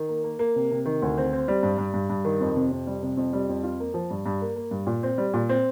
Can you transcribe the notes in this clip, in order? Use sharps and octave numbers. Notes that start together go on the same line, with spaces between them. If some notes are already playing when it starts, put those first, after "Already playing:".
Already playing: D#3
A#3
A#3
A#3
C3
C3
D#3
D2
C4
C4
G3
G2
G2
G2
G2
D#3
F2
C3
F2
G3
C3
F2
G3
F2
F4
A#3
F3
G2
G2
A#3
A#3
G2
A#2
C4
G3
A#2
C4